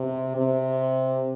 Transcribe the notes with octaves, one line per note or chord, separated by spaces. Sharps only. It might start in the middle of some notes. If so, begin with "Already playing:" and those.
Already playing: C3
C3